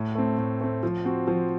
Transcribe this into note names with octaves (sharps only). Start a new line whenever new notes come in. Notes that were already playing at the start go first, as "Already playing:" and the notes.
Already playing: A2
A3 C4
A2
A3 C4
F3
C4 F#4
F3